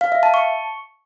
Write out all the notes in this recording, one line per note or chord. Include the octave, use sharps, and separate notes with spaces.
F5
E5
A5
C#6